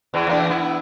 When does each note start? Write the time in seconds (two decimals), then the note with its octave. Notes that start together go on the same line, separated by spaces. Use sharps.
0.14 E2 E3
0.27 E2 A#3 D4
0.50 B3 E4